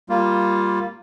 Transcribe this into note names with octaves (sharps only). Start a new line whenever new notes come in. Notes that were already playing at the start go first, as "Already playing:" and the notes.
G3 A#3 F4